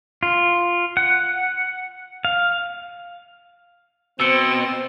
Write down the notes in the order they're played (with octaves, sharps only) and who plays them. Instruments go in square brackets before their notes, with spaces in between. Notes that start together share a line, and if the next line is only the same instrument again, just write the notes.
[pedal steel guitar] F4
F#5
F5
[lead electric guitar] B2 [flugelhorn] C4 [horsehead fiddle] C5 [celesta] E6 C#7